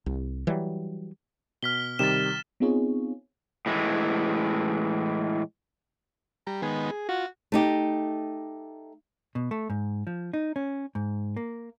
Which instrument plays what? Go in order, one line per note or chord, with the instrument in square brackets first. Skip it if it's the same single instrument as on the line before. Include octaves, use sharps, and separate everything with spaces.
[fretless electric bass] C2
E3 F#3 G3
[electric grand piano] B2 [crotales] F6 B6 G7
[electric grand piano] C3 D#3 G3 [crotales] A6 E7
[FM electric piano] B3 C4 D#4 F4 G#4 C#5
[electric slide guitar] A2 E3 G#3
[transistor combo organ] G3 [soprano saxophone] A#5
[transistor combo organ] D#3 G#3 B3 [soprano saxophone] G#4
[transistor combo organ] F4 [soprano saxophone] F#4
[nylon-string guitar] A3 D#4 G4
[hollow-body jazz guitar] B2
A3
G#2
F3
D#4
C#4
G#2
A#3